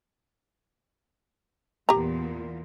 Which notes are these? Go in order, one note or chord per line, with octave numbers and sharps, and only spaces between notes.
E2 A#2 G4 A#5